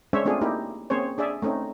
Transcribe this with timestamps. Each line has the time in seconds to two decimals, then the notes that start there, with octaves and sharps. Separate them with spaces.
0.13 G#3 C#4 D4 C5 C#5 E5
0.25 A3 C4 D4 F4 G#4
0.41 A#3 D#4 E4 G4
0.90 A#3 C4 C#4 G#4 C5 C#5
1.18 D4 G#4 D5 E5
1.42 A3 C4 C#4 D#4